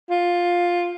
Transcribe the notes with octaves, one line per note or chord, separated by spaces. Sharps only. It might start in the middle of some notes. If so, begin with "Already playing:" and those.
F4